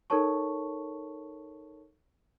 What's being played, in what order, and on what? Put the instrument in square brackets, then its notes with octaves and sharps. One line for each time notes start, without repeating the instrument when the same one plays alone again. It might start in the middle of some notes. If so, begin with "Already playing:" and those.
[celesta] D#4 A4 A#4 C#5 A5 C#6